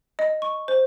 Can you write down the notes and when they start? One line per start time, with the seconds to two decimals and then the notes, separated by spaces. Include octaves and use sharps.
0.19 D#5
0.42 C#6
0.68 C5